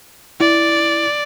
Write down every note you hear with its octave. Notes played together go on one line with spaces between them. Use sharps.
E4 D5